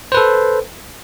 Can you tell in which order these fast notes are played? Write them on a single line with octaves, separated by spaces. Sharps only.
C5 B4 A4